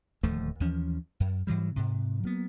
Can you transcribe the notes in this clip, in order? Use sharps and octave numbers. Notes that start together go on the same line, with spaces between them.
D1 D#2 F3 A3
D#2 E3 F3 C#4
F#2
G#2 E3 F#3 G3
G#2 C3
F#3 A#3 B3